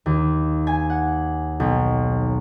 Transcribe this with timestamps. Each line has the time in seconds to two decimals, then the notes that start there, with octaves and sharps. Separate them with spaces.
0.06 D#2
0.67 G#5
0.90 F#5
1.60 B1